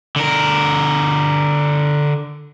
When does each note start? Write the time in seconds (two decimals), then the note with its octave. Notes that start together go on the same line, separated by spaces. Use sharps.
0.16 D3 A#4